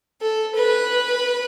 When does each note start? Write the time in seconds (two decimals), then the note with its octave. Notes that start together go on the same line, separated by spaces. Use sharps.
0.21 A4
0.55 B4